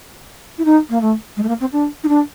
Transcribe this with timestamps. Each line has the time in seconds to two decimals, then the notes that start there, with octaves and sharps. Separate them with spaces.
0.58 E4
0.65 D#4
0.90 A#3
1.01 A3
1.37 G#3
1.43 A3
1.48 A#3
1.60 C4
1.73 D4
2.03 D#4
2.08 D4